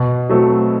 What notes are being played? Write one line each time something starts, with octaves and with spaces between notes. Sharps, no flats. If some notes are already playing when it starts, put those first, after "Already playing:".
Already playing: B2
F#3 A3 C4